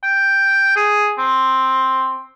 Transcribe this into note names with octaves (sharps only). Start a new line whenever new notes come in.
G5
G#4
C4